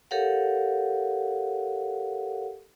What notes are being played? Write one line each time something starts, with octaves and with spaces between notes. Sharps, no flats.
G4 A4 A#4 C#5 F5 F#5